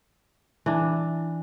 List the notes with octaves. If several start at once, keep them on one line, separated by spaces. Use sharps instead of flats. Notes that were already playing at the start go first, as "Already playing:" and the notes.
E3 D4